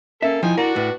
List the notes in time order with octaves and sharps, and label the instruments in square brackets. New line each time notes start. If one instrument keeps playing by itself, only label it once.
[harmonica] A#3 A4 [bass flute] C#4 [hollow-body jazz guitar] E5
[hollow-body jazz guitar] F3 [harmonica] D#4 G5 G#5 [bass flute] E4
[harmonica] D4 F#4 [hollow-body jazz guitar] A#4
[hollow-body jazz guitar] A2 [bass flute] B4